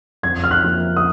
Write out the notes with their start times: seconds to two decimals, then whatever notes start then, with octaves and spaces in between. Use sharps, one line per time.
0.23 F2 G#6
0.44 F6
0.51 F#6
0.64 F3 A#3
0.96 D#6